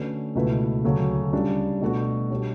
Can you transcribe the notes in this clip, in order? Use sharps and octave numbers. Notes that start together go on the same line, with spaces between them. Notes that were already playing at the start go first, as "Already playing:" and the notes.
Already playing: D3 A3 C#4 F#4 B4
C#2 B2 A3 E4 B4
D2 C#3 F#3 A3 C#4
C#3 G3 D4
B2 A3 D4 F#4
B2 G3 D4 G4 C#5